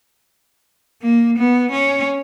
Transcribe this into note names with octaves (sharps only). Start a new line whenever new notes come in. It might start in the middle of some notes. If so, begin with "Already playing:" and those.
A#3
B3
C#4